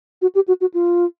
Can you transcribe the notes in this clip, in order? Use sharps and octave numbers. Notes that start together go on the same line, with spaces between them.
F#4
G4
F#4
F#4
F4